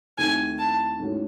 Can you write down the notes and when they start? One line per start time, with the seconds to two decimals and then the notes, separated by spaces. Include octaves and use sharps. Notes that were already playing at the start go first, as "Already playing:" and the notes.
0.18 D#2 D#3 A3 C4 E4 G#5
0.58 A5
1.00 G#2 E3 A3 C#4 F#4